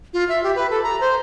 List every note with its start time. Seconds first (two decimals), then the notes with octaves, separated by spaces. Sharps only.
0.14 F4
0.29 E5
0.43 G4
0.56 B4
0.70 A4
0.83 A#5
1.01 C5